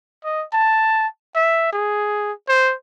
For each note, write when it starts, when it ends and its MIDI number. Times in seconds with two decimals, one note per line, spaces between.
0.24 0.44 75
0.53 1.07 81
1.35 1.68 76
1.73 2.32 68
2.49 2.74 72